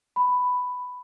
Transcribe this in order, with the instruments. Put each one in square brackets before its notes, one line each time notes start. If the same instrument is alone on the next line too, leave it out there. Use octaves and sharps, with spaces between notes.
[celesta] B5